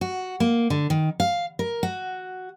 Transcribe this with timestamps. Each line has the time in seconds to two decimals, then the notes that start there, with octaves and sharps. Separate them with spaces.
0.01 F#4
0.40 A#3
0.70 D3
0.90 D#3
1.20 F5
1.59 A#4
1.83 F#4